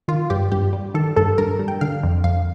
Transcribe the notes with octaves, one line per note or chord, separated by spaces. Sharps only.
D#3 F4
G2 G4
G2 G4
G3
D#3 A4
G2 A4
G2 A#4
G3
G5
D3 F5
F2
F2 F5